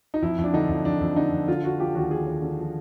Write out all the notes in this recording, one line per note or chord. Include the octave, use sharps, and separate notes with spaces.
D#4
F2 E4
F2
D4
D3 D#4
F2
F2 D4
F2
D3 D#4
F2
D3 F4
D3 F#4
F3 G4
D#2 F#4
F3 G#4
D#2
D3
F3